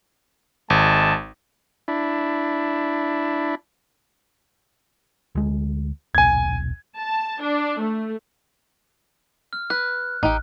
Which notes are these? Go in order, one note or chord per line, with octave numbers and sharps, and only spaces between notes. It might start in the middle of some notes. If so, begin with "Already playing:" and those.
G#1 G#3 A5
D4 E4
D2 G#3
D#1 B1 G#5 G#6
A5
D4
A3
F6
B4 F#6
A1 D#4 G4